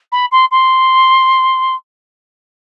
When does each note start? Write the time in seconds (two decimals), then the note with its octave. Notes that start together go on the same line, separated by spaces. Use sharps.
0.12 B5
0.32 C6
0.51 C6